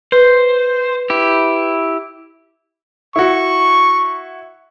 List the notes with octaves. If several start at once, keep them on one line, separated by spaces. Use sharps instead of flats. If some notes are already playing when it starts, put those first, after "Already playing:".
B4 C5
E4 G4
E4 F#4 C#6